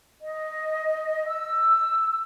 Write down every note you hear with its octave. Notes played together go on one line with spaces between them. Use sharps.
D#5
E6